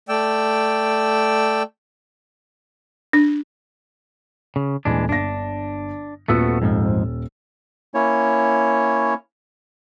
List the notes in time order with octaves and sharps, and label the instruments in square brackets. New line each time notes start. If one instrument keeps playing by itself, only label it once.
[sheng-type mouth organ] A3 D5 G5 E6
[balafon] D4
[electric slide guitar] C#3
[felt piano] D#1 [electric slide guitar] E3 G#3 D4
[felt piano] G1 A#6 [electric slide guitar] D4
[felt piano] D#1 F4 E6 [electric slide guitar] A3 B3 F#4
[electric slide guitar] F2 G#2 F3
[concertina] A#3 C#4 E4 C#5